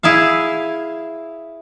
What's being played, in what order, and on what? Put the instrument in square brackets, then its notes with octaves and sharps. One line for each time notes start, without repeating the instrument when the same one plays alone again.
[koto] E4 G#4 E5 F5